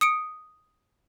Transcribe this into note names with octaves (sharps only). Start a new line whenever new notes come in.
D#6 C#7 D7